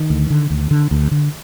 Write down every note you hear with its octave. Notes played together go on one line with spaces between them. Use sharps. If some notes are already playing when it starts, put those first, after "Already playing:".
Already playing: D#3
D2
D3
D2
D3
D2
D3